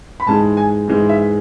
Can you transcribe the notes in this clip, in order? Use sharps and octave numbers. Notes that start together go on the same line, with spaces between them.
B5
G#2 E3 G#3 A5
G#5
G#2 E3 G#3
E5